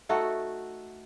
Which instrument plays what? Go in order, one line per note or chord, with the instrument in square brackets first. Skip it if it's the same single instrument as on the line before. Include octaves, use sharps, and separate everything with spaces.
[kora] A3 D#4 F#4 A4